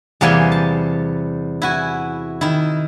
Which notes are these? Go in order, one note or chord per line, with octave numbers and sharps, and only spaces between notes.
E2 C3 G3 A#3 G5 G#5
A5
E4 F#4 G#5
D#3 E4